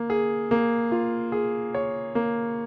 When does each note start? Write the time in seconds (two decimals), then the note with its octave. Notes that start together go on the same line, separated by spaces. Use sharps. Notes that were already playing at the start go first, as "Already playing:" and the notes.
Already playing: A#3
0.10 G#4
0.51 A#3
0.92 F4
1.32 G#4
1.74 C#5
2.15 A#3